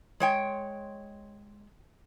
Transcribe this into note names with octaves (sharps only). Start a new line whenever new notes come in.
G#3 C#5 G5